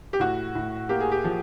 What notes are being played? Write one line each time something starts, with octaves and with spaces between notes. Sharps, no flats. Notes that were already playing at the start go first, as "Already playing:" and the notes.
G4
A2 F#4
A2
A#3 G4
G#4
G4
F3